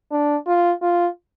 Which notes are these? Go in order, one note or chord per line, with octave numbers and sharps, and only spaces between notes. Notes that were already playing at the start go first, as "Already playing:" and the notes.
D4
F4
F4